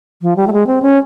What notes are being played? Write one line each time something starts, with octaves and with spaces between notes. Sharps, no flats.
F3
G3
A3
G#3
C4
C#4